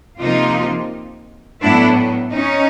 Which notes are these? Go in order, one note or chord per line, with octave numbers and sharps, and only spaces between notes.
C3 F3 A#3 D#4 F4
A2 F#3 B3 D4 E4
C#4 D#4